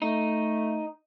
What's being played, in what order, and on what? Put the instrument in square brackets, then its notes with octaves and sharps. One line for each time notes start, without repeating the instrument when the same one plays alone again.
[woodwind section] A3 [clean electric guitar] D#4